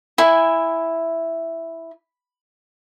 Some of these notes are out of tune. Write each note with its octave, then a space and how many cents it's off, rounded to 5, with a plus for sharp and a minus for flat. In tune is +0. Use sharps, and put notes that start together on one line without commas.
E4 +0 G#5 -20